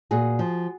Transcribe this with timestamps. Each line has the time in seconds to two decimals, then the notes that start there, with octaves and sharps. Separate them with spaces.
0.11 A#2 F#4 G#4
0.39 F3